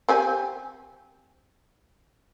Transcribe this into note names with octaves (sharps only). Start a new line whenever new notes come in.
C4 G4 G#5